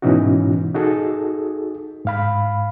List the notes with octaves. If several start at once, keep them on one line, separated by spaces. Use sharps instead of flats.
G#2 B2 E3 C#4 D#4 F#4
D#4 F#4 G#4 A4
G#2 F5 B5